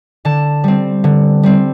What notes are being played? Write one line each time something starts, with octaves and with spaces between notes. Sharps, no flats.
D3 A5
G3 C4
D3
G3 C4